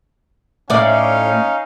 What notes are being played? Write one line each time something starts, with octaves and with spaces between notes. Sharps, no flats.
A2 C#4 D#4 D5 F5